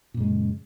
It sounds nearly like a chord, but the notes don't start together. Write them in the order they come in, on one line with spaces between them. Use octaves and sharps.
A#2 F#2 G#3 C#3